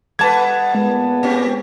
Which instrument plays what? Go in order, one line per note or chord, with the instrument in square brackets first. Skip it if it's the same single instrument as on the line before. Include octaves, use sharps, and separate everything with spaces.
[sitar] G3 B4 [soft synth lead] F#5 [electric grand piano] A5 G#6
[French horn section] A#2 B3 [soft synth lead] G#3
[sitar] C4 C#4 G4